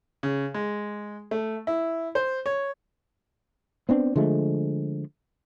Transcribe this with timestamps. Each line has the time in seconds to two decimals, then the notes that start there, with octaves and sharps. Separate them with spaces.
0.23 C#3
0.54 G#3
1.31 A3
1.67 E4
2.15 C5
2.46 C#5
3.89 B3 C4 D4
4.16 D3 F3 G#3 A3